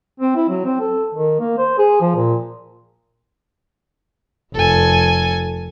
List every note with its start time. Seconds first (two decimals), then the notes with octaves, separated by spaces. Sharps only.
0.20 C4
0.36 E4
0.50 F#3
0.65 C4
0.80 A4
1.14 D#3
1.40 A#3
1.58 C5
1.78 G#4
2.01 F3
2.16 A#2
4.54 F1 A4 G#5